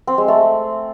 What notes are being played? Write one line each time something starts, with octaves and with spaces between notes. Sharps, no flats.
C4
G#3
A3